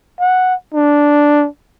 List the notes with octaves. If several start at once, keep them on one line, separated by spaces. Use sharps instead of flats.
F#5
D4